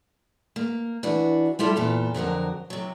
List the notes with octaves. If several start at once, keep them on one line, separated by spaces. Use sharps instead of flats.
A#3
E3 D4 F#4
G3 E4 F4 G4 A4
E2 A#2 F4 G4 A4
F2 D3 F#3 A#4
C3 F#3